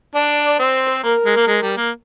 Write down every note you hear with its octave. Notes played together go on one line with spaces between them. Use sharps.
D4 D5
C4 C5
A#3 A#4
G#3
A#3
G#3
G3
A#3